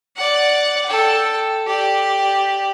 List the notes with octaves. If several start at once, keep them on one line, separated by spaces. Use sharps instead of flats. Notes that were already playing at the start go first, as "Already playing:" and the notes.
D5 F#5
A4 G5
G4 D5